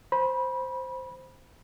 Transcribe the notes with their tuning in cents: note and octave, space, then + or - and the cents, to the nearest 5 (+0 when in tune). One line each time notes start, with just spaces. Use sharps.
C5 +0 B5 -25